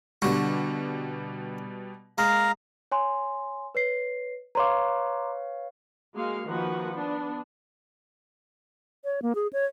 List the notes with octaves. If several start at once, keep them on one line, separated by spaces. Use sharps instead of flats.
B2 D3 G3 F#4
G#3 F5 A#5
C#5 G#5 C6
B4 C#5 C7
B4 C#5 F5 A#5 C6 D6
G#3 A#3 F#4 F5
D#3 F3 A#3 F#4 B4 F#5
B3 D4
C#5
A#3
G#4
C#5